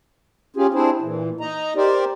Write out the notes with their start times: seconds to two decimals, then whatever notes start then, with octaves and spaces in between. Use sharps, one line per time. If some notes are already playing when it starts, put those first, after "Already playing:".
0.56 C#4 F4 G4 G#4
0.74 C4 D4 E4 G#4 C5
1.01 A#2 E3
1.40 D#4 D#5 A#5
1.76 G4 A#4 C5 D5